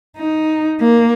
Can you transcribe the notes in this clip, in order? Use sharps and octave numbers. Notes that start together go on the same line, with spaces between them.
D#4
A#3